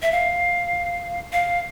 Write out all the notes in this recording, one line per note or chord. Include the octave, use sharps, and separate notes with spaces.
E5
F5
F5